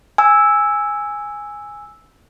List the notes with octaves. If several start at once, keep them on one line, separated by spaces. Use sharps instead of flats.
G#5 E6